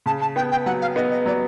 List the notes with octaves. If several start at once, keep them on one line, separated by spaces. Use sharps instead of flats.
C#3 A5
A5
B3 G5
G5
F#3 F#5
F5
B3 D#5
D#5
F#3 D5